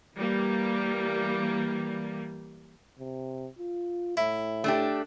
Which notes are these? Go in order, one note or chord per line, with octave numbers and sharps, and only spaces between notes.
E3 G3 A#3
C3
F4
A2 E4
A3 D4 G4